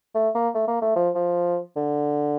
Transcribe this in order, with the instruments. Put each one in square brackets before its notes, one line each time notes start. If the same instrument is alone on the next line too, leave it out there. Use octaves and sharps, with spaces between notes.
[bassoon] A3
A#3
A3
A#3
A3
F3
F3
D3